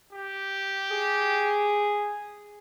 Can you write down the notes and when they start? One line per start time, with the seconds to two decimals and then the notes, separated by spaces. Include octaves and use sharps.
0.13 G4
0.91 G#4